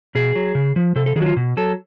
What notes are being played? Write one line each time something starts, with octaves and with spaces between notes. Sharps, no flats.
B2 G#4
F#3
C#3
F3
C3 A4
A4
D#3 F#3 F#4 G#4
F4
B2
F#3 A4